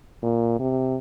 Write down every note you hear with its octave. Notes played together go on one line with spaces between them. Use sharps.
A#2
C3